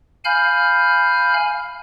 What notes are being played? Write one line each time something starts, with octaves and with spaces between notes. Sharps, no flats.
F5 G#5 B5 F6 G6